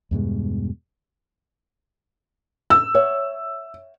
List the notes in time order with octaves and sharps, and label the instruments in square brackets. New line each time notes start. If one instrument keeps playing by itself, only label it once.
[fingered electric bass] E2 G2 B2 G#3
[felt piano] E6
[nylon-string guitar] C#5 E5 F#5